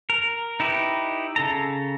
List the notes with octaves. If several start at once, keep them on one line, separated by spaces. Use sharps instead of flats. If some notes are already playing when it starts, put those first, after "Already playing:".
A#4
D#4 E4 G4 B4
C#3 A4 A#5